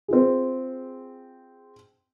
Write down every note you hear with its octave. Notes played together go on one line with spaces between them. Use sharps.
C4 F4 G#4